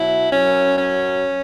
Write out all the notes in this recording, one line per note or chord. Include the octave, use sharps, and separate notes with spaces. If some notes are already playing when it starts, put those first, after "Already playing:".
Already playing: B2 F#3 E4
F#2 F#3 C#4
C#4